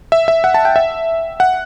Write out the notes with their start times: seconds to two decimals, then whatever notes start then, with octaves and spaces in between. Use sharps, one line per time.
0.12 E5
0.28 E5
0.44 F#5
0.54 A5
0.65 G5
0.76 E5
1.40 F#5